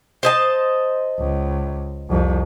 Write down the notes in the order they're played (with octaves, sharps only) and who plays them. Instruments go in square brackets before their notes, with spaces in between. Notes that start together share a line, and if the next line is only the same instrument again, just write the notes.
[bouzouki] C5 D#5 A5
[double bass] C#2
C2 F2